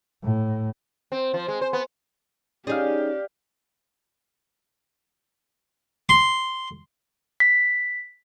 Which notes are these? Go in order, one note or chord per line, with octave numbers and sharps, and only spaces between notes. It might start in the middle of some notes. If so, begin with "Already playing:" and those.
A2
C4
F3
G#3
C5
B3
C#4 D#4 G4 G#4 D5 F5
C6
B6